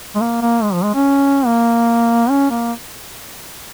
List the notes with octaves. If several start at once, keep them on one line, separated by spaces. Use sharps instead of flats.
G#3
A#3
A#3
G#3
F3
G#3
C#4
A#3
C#4
A#3